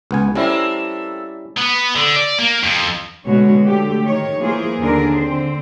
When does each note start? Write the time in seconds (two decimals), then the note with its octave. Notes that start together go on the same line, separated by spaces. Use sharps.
0.11 C#2 B3 G#5
0.35 G3 A3 A#3 C4 C#4 E4
1.57 B3
1.96 D3
2.16 D5
2.39 A#3
2.63 F2
3.26 B2 D3 G#3 F#4 C#5
3.64 D3 A3 G4
4.05 D#3 C#5
4.39 E3 A#3 F4 G#4 C5
4.80 D#2 D3 D4 G#4 A#4
5.17 D3 C4 C5